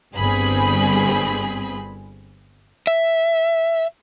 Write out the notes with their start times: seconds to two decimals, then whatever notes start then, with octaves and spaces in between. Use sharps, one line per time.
0.16 G1 G2 C4 G#4 B5
2.87 E5